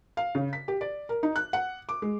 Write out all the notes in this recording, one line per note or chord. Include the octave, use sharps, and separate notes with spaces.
F5
C#3
B6
G4
D5
A#4
D#4
F#6
F#5
D6
G#3